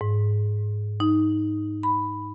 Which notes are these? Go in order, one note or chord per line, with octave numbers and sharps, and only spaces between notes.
G#2
D#4
B5